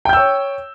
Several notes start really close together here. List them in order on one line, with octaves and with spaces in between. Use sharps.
G5 G6 E6 C#5